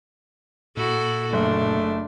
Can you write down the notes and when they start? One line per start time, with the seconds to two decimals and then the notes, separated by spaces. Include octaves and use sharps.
0.77 A#2 E4 F#4 A4
1.33 F#1 A3 D4